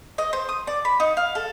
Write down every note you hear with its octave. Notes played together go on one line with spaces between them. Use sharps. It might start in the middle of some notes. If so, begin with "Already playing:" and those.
D#5
C5
D#6
D5
B5
D#4
F5
A4